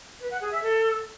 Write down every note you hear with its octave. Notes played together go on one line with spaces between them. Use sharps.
B4
F#5
G#4
E5
A4